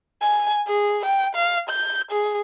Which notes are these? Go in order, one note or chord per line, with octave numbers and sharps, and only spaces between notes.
G#5
G#4
G5
F5
G6
G#4